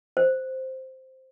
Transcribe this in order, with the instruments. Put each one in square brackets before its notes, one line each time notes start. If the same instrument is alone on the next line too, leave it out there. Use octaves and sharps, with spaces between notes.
[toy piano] C5